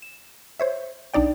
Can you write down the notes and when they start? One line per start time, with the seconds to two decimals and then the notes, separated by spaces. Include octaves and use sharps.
0.02 E7
0.60 C5 C#5 E5
1.14 B1 D4 D#4 D5 G5